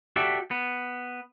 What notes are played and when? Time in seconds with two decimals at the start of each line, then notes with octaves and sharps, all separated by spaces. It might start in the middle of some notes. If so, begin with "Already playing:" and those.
0.16 F#4 G4 A4 D5 E5
0.51 B3